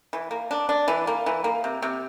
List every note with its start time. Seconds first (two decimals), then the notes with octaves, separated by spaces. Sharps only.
0.13 E3
0.31 A#3
0.51 D4
0.69 D4
0.88 E3
1.07 A#3
1.26 E3
1.44 A#3
1.64 C3
1.82 C3